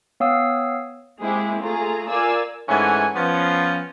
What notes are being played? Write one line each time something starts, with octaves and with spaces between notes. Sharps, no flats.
B3 C#5 F5 G5 D#6 E6
G#3 A#3 C4 E4 G4 G#4
A3 F4 G#4 A#5
F4 A#4 D5 F5 G#5 E6
G#2 E3 A3 C#4 F#5 G#5
F3 B3 C#4